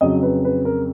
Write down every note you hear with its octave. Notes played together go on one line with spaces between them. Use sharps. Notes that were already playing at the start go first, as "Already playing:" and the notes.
F2 C#3 F#3 D#5
B4
B4
A#4